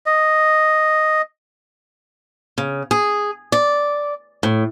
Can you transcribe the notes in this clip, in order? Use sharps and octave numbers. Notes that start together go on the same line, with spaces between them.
D#5
C#3
G#4
D5
A2